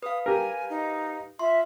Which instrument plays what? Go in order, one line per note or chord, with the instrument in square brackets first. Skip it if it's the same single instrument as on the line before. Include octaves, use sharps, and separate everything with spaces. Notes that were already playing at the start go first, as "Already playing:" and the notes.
[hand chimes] B4 F5 [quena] D#6
[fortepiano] G4 A#4 [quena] G#5
[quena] D#4
[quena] F4 [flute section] E5 [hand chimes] C6